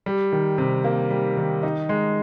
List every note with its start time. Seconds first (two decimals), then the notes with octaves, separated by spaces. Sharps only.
0.06 G3
0.32 D#3
0.58 C3
0.84 A#3
1.10 G3
1.37 D#3
1.63 D#4
1.89 G#3